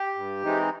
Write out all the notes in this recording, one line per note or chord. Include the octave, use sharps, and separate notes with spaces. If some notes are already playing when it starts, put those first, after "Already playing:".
Already playing: G4
G2
E3 G#3 C4 D#4